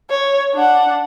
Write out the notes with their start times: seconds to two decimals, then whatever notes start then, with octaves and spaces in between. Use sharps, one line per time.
0.10 C#5
0.54 D4 F#5